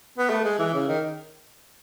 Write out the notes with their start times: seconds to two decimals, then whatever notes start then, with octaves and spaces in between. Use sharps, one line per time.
0.18 B3
0.30 A3
0.44 G#3
0.59 E3
0.73 C#3
0.88 D#3